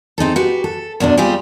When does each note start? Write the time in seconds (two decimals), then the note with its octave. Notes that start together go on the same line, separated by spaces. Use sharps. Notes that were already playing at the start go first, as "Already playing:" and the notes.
0.18 C4 D#4 G#4 A4
0.36 F#4 G4 B4
0.64 A4
1.00 E2 B2 D3 D4
1.17 G3 C4 F4 G4 G#4